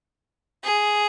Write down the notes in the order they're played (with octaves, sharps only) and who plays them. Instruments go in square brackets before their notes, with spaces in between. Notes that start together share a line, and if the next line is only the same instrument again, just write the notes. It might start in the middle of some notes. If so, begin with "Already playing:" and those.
[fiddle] G#4